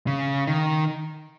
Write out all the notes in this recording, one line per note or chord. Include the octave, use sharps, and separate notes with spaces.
C#3
D#3